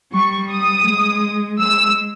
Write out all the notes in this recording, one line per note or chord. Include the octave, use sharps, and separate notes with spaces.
G3 C#6
D#6
G#3
G#3 E6